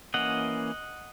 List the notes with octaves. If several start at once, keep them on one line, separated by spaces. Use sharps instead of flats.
E3 A#3 C#4 D#5 F#5